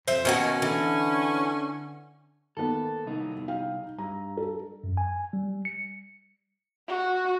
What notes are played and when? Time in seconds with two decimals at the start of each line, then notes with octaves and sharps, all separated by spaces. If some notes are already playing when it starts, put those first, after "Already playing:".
0.08 F2 C5 E5
0.25 B2 D#3 A#3 C#4 F#4
0.62 D3 E3
2.57 D#3 A#3 B3 A4
3.05 C2 D#4
3.48 F5 G5
3.98 G2 A#5
4.37 A4
4.84 F#2
4.97 G#5
5.33 G3
5.65 C#7
6.88 F#4